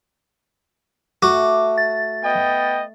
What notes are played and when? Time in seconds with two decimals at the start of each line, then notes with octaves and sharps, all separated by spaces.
1.22 A3 F#4 D6
1.78 A6
2.23 B3 D#5 G5